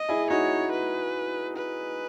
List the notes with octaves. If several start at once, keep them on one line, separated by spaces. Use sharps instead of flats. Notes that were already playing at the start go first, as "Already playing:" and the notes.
Already playing: D#5
E4 G#4
D#4 F#4 C#5
B4
B4